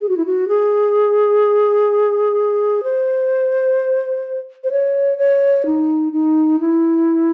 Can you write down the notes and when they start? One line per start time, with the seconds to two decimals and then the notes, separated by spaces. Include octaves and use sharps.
0.01 G#4
0.09 F#4
0.17 E4
0.26 F#4
0.48 G#4
2.83 C5
4.64 C5
4.71 C#5
5.18 C#5
5.66 D#4
6.12 D#4
6.60 E4